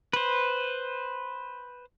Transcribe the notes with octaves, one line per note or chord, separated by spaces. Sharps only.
B4 C5